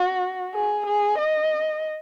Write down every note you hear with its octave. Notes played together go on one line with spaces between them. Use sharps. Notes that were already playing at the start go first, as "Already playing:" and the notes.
Already playing: F#4
G#4
G#4
D#5